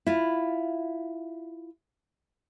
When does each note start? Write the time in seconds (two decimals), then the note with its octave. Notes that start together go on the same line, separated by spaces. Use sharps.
0.07 E4 F4